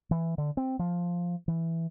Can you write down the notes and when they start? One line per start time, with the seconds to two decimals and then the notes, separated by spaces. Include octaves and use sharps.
0.11 E3
0.38 D3
0.57 C4
0.79 F3
1.48 E3